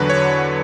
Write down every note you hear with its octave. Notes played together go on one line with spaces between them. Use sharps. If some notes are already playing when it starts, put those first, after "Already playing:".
Already playing: E2 D3 F#3 B4
C#5